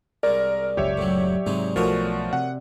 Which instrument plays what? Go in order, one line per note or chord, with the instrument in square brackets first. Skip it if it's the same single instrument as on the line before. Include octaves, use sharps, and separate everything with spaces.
[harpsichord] C2 G#3 [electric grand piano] A#4 [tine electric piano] D5
[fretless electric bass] F#1 C#2 F#2 [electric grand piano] G4 C#5 E5
[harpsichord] A2 F#3
[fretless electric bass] G#2 C3 [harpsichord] F#3 G#3 D#4
[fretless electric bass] B1 [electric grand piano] F3 A3 F#4 [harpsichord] A#4 C#5 G#5
[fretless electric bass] C3 [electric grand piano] F#5